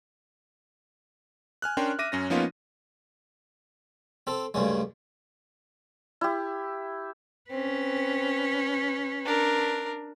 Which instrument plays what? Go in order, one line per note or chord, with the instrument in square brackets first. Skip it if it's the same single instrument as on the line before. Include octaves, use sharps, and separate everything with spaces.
[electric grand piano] G#5 F6 F#6
C#4 D4 A#4 G5 C6
E5 D6 A#6 D#7
F#2 C#4 A#6
F3 A#3 B3 C#4 D#4 F4
[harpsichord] C4 A4
D2 G2 C#3 G#3
[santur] E4 G4
[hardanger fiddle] C4 [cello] C#4 B4
[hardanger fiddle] D4 A#4